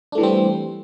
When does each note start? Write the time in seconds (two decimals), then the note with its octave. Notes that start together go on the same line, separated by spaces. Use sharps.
0.12 D4
0.15 A3
0.18 E3
0.21 G3
0.23 C4